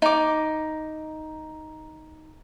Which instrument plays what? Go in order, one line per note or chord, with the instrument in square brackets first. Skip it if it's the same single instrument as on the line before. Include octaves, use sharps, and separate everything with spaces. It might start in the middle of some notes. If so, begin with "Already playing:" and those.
[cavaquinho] D#4 D6